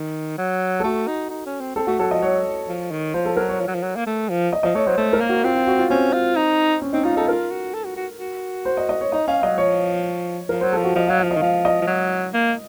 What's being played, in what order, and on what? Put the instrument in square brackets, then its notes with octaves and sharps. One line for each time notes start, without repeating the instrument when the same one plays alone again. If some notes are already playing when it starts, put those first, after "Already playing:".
Already playing: [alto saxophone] D#3
F#3
[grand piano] A4
[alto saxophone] A3 [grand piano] F#4
[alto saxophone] D#4
D#4
C#4
C4
[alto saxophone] C4 [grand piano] A4
[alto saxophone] A3 [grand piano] F#4
[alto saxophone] F#3 [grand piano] A4
[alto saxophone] F3 [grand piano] D#5
[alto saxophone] F#3 [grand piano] C#5
[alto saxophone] F3
D#3
[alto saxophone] F3 [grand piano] C5
[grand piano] A4
[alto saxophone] F#3 [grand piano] A#4
[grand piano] C#5
[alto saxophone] F3
F#3
F3
F#3
A#3
A3
F3
[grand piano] D#5
[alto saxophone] F3 [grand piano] D#5
[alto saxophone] A3 [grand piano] C#5
[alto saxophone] F#3 [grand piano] C5
[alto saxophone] A3 [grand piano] C5
[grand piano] A#4
[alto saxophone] A#3
[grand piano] F#4
[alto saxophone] C4 [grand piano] F4
[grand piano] F4
F#4
F4
[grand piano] C4 [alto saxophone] C#4
[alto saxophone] F4
D#4
[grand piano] C#4
[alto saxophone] C4 [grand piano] D#4
[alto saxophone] D#4 [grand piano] F4
[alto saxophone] D#4 [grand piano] A4
[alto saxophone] F4 [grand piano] A#4
[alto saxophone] F#4
A4
F#4
F#4
F#4
[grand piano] C5
D#5
D#5
C#5
[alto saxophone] D#4 [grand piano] D#5
[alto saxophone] C#4 [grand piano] F5
[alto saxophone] F#3 [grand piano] D#5
[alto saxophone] F3 [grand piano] C#5
[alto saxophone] F3 [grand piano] A#4
[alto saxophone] F#3 [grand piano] C5
[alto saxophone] F3 [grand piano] A4
[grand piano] F#4
[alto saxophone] F3 [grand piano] D#5
[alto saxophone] F#3 [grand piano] F5
[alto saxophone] F3 [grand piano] F5
[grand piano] D#5
[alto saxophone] D#3
[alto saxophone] F3 [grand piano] F5
[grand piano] D#5
[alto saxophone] F3
F#3
A#3